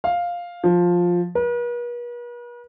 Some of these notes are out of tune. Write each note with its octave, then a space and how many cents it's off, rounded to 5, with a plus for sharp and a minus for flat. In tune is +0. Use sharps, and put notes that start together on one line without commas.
F5 +5
F3 +10
B4 -45